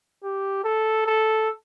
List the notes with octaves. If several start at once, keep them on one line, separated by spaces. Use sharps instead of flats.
G4
A4
A4